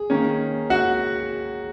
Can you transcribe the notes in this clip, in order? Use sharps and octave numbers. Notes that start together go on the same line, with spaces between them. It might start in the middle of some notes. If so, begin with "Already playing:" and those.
Already playing: G#4
D#3 A#3 C#4
F#4 F#5